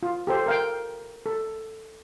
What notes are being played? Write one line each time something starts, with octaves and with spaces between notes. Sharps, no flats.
F4
G4 A4 C5
A#4 F5 G5
A4